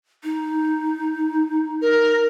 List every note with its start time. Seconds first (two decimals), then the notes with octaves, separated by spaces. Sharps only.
0.24 D#4
1.82 A#4